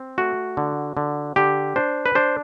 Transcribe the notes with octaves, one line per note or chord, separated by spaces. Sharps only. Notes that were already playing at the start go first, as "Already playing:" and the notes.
Already playing: C4
A3 F#4
D3
D3
D3 G4
D4 C5
B4
D4 C5